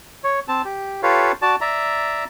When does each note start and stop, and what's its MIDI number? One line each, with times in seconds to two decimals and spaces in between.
0.24 0.40 73
0.48 0.62 60
0.48 0.62 81
0.65 1.02 67
1.03 1.32 65
1.03 1.32 67
1.03 1.32 69
1.03 1.32 71
1.03 1.32 73
1.03 1.32 77
1.42 1.56 66
1.42 1.56 74
1.42 1.56 81
1.61 2.25 74
1.61 2.25 76
1.61 2.25 82